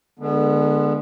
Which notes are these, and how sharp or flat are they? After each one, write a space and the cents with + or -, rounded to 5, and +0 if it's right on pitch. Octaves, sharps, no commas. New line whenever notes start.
D3 +20 G#3 +0 B3 -20